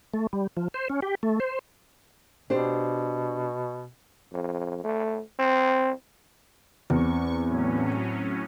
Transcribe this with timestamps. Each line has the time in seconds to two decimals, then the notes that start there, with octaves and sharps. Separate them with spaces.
0.14 A3
0.33 G3
0.57 F3
0.74 C5
0.90 C#4
1.02 G4
1.23 A3
1.40 C5
2.50 B2 D4 G4 C5
4.33 F2
4.84 A3
5.39 C4
6.90 E2 C4 C#6
7.48 A2 F#3 C#4